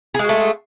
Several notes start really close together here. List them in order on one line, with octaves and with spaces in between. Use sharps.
G#4 G#3 F#4 A3